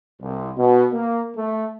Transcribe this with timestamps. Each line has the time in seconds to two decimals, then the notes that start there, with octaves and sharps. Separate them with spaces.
0.20 C2
0.56 B2
0.93 A#3
1.35 A3